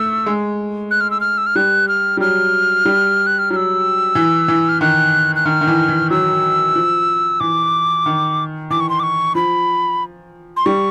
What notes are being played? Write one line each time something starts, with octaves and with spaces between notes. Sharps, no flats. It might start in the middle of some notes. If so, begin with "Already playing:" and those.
Already playing: A3 E6
G#3
F#6
F6
E6
F6
E6
F6
G3 F#6
F6
G3
F#3 F6
G3
F#6
F6
F#3 F6
E6
E3
E3
F6
D#3 F#6
F#6
D#3 F6
D#3
E3
E3
F#3 E6
F3
E3 D6
D#3
E3 D6
C#6
C6
D6
C#6
F3 B5
C6
G3 C#6